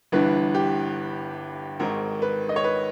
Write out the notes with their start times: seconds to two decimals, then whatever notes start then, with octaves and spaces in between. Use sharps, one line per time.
0.12 G1 G2 E3 B4
0.55 G4
1.80 G#1 G#2 D#3 A#4
2.22 B4
2.49 D#5
2.56 C#5
2.64 B4